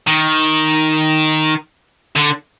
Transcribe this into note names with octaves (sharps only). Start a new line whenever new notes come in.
D#3
D3